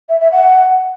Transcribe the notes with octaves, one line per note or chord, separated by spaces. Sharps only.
E5
E5
F#5